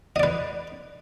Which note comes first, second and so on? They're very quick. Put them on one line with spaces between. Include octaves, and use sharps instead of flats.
D#5 D5 B4